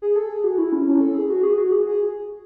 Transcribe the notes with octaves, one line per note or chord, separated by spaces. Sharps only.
G#4
A4
G#4
F#4
E4
C#4
C#4
A4
G#4
F#4
G#4
F#4
G#4
G#4